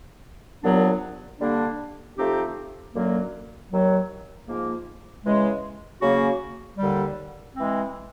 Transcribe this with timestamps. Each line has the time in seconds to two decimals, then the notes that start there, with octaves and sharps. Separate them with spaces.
0.63 C2 A#2 F#3 B3 D4
1.40 D3 G3 A#3 D4
2.17 F3 A3 C4 D#4 G4
2.95 F#2 D3 F#3 A#3
3.72 D#2 D#3 F#3
4.47 G#2 F3 A#3
5.25 C#3 E3 G#3
6.02 C#3 F#3 A#3 C#4 F#4
6.78 D#2 D3 G3
7.56 E3 G#3 C4